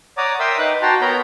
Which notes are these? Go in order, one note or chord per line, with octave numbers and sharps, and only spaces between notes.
C#5 D5 F#5 A#5 D6 D#6
A#4 E5 G5 C6 D#6 E6
D#4 B4 D6 F#6
F#4 F#5 G5 A5 A#5 C6
B3 A#4 C#5 A#5 B5 G6